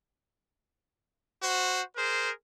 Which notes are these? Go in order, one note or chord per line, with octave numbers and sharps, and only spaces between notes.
F#4 C5
G#4 A#4 C5